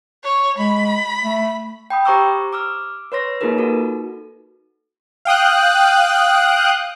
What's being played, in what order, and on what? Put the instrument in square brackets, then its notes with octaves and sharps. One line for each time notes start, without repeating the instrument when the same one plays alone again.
[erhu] C#5
[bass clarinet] G#3 [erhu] B5
[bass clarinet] A3
[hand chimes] G5 B5 D#6
G4 C5 A#5 C#6 D6 E6
D6 E6 F6
B4 C#5 C6 A#6
A#3 D#4 F4 G#4 A#4 B4
D#4 F#4 A4
[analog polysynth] F5 G5 D#6 F#6